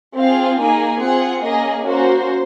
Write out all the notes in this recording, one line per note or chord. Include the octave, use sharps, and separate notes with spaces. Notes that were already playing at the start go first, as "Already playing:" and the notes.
C4 F4 G#4 F5
A#3 D#4 G#4 G#5
C4 F4 G#4 F#5
A#3 C#4 G#4 D#5
A#3 C#4 F#4 C5